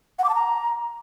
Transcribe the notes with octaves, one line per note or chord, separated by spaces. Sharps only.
F#5
D6
A5
A#5